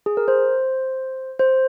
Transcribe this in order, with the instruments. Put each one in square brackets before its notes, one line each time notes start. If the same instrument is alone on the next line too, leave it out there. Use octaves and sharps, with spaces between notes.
[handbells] G#4
A#4
C5
C5